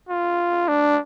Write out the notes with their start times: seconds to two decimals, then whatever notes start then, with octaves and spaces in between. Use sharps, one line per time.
0.09 F4
0.68 D4